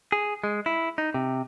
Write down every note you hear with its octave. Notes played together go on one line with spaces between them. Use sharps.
G#4
G#3
E4
D#4
C3